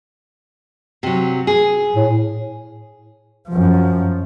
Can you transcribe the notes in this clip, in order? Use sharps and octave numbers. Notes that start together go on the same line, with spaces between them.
C3 F#3
G#4
A2
F#2 F3